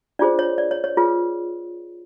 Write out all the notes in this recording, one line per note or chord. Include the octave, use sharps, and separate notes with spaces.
D4 F4 G#4 C5 D5
C#5
D5
C#5
C#5
F4 G#4 B4